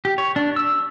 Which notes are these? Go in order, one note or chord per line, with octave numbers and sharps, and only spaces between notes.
G4
C#5
D4
E6